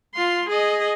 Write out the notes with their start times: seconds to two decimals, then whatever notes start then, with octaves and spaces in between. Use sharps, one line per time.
0.14 F4 C6
0.49 G#4 D#5